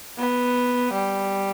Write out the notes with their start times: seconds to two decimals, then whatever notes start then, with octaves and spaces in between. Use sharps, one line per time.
0.18 B3
0.93 G3